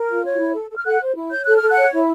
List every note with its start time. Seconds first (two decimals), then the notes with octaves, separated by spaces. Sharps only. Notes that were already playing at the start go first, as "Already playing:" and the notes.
Already playing: A#4
0.09 F4
0.25 C#5
0.39 E4
0.55 A4
0.70 A4
0.76 F6
0.85 A4 F#5 F#6
1.01 C5
1.15 E4
1.31 C#5 G6
1.44 A4 F#6
1.57 F6
1.62 A4
1.70 F#5 F#6
1.77 C#5
1.93 E4